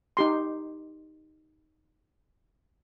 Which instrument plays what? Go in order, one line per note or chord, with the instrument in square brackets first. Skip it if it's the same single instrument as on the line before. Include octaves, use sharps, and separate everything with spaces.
[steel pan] D#4 G4 C6